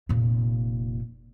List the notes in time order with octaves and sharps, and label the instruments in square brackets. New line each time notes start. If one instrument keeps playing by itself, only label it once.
[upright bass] F1 A#2